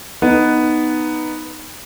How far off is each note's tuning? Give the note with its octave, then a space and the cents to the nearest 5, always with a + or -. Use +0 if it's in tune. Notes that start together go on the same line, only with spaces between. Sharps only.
B3 +0 D#4 -5